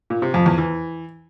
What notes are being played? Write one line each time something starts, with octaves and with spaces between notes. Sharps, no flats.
A#2
C3
F2
E2
E3